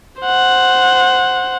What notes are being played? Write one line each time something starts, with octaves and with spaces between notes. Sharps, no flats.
C5 F#5